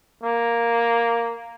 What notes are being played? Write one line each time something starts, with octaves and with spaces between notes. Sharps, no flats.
A#3